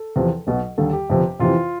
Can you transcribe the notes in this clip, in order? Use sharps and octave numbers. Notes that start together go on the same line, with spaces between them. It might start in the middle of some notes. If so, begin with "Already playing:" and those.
Already playing: A4
E2 C3 F3
B1 B2 F#3
D#2 D3 G3 A4
G4
G1 F2 C3 F3
F2 C3 E3 F4